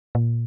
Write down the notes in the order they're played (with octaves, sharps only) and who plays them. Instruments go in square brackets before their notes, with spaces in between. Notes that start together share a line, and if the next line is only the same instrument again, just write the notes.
[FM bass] A#2